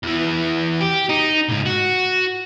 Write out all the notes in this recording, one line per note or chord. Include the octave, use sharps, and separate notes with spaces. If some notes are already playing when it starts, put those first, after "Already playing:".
E2 E3
G4
D#4
C#2 G#2
F#4